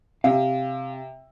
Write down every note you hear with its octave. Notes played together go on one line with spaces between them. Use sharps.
C3 F5